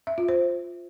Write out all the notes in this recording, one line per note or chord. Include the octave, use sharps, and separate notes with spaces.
E5
F4
C5